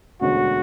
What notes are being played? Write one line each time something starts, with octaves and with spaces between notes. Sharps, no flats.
E1 D2 D3 G#3 C#4 F#4